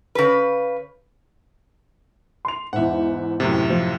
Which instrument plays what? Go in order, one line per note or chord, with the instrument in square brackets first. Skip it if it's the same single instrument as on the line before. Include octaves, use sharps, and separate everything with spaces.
[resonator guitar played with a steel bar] C#3 B4
[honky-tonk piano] C6 F7
[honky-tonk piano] E2 G#2 [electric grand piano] E5 F#5
[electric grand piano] F#2 A2 C3
[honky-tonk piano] F3